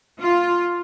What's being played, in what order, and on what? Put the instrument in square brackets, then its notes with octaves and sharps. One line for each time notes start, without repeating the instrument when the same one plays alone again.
[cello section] F4